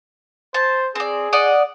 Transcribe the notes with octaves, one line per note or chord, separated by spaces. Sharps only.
C5 A5
C4 G#4 D5
D5 D#5 F#5